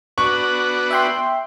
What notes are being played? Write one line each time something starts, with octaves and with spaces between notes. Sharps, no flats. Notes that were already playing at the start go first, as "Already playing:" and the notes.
B3 D4 F#4 C#6
E5 G5 C6